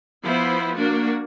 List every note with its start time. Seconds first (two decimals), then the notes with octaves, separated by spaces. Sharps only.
0.23 F3 B3 E4 C5
0.76 A#3 D4 F#4